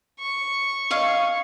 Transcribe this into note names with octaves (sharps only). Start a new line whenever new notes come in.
C#6
C#5 D#5 F5